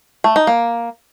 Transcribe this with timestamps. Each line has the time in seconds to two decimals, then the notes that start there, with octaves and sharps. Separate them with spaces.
0.24 A3
0.36 D#4
0.47 A#3